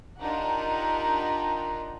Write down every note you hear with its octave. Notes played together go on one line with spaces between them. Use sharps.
D4 D#4 F4 G4 A#4 F#5